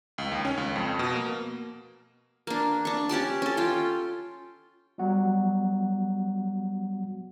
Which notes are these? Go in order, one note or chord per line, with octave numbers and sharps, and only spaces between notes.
C#2
D#2
C#4
C#2
F2
B2
A#3
A#3 D4
D4 C#6
C#4 G4 D5 A5
C#4 A4
F4 G5
F#3 G3 B3 F#4 F#5